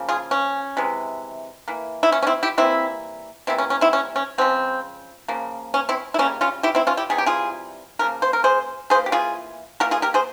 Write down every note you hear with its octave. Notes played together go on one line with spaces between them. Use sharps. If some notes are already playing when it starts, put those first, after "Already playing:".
Already playing: C#3 F3 A#3
F4 G#4
C#4
C3 E3 G#3
E3 A#3
E4
C#4
C#4
C4 E4
E4 G4
E3 G3 A#3 C4 E4
C3 E3 G3 A#3 C4 E4
C#4
C#4
C4 E4
C#4
C#4
C#3 F3 G#3 C4
C#3 F3 A#3
C#4
C4 E4
E4
C#3 G3 A#3 C#4
C#4 F4
E4 G4
C4 E4
C#4 F4
E4 G4
C3 E3 G3 G#4
G4
F4 G#4
C#3 F3 A#3 A#4
C5
A#4
G#4 C5
E3 A#3 G#4 C5
G4
F4 G#4
E3 A#3 G4 A#4
F4 G#4
G4 A#4
G#4 C5